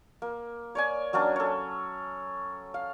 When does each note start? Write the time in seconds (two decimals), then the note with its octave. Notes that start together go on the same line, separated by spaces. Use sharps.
0.22 A#3
0.75 C#5 D5 G#5
1.13 F#3 A#3 C#4 D4
1.36 A4 C#5
2.74 F5